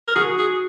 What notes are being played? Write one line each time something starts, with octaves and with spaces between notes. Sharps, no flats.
A#4
F#4 G#4
G#4